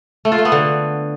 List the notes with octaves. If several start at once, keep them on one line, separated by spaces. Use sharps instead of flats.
A3
F4
A3
B3
D3